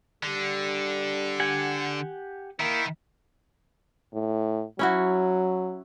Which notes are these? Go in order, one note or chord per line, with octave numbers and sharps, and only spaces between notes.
D3 G3
G4 F#5 G#5
D#3 A#3 E4
A2
F#3 C#4 E4 F#4